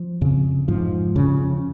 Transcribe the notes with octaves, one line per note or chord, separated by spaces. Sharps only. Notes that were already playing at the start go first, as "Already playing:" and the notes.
Already playing: F3
F2 C#3
G#2 F3
F2 C#3